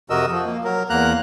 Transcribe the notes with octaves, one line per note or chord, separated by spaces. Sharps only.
F2 C3 F#4 A#4 D#5 E6
F3
A#3
F#3 A#4
E2 A#3 A#5 F#6